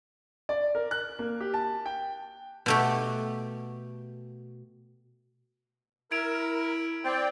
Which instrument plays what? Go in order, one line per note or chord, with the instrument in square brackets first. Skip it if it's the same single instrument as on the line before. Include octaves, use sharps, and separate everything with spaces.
[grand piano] D5
A#4
F#6
A#3
G4
A5
G5
[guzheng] B2 A3 G4
[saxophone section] E4 [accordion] A#4 [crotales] G#6 D7 F7
[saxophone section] C4 [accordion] D5 G5